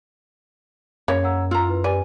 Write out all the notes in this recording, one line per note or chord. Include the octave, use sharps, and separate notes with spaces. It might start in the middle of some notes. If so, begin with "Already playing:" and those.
F#2 C#3 A#3 C#5
F#5 A#5 E6
F4 A#5 E6
E4 B4
G4 B4 D5 G#5